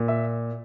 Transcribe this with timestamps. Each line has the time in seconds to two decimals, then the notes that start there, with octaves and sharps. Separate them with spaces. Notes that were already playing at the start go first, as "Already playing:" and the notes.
Already playing: A#2
0.08 E5